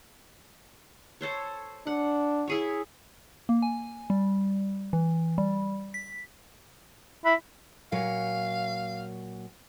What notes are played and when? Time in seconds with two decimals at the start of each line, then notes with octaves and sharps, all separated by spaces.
1.21 A4 C5 C#5
1.87 D4 F#5
2.48 E4 G#4 C#5
3.49 A#3
3.62 G#5
4.10 G3
4.93 E3
5.38 G3
5.94 B6
7.25 E4 B5
7.92 A#2 F#3 C#5 F5